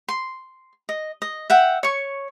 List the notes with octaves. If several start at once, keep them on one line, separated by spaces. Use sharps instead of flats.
C6
D#5
D#5
E5 F#5 G5
C#5 C#6